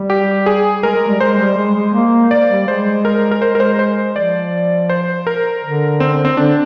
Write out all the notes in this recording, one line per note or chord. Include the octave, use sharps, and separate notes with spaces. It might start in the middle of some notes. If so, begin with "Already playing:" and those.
Already playing: G3
G4
G#4
G#3 A#4
G#3
G3
G#3 C5
G3
G#3
G#3
A#3
D5
G3
G#3 C5
A#4
A#4
G#3 C5
A#4
C5
C5
F3 D5
C5
A#4
D3
C4
C4
D3 D4